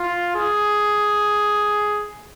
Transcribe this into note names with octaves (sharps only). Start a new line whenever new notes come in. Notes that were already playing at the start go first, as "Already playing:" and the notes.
Already playing: F4
G#4